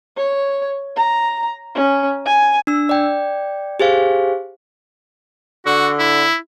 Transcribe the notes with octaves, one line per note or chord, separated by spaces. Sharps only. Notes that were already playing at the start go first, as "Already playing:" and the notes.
C#5
A#5
C#4
G#5
D4 E6
D5 G5
G4 G#4 C5 F5
D3 F#4
E4